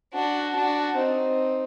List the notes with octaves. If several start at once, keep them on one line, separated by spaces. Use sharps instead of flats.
D4 F#4
D4 F#4
C4 D#4